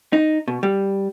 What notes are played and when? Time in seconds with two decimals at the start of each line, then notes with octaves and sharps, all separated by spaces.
0.13 D#4
0.48 B2
0.63 G3